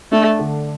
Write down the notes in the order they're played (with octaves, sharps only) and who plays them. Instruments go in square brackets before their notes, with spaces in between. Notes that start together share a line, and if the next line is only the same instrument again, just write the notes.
[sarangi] A3 [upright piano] D4
[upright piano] D3